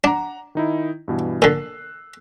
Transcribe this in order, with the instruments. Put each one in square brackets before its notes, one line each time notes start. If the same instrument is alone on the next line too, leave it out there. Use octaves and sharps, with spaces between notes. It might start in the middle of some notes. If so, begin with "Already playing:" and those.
[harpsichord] D4 [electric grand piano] F#5 A#5
[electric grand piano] D#3 D#4 E4
G2 B2 E3
[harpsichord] A#2 D3 [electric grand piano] E6 F#6 C7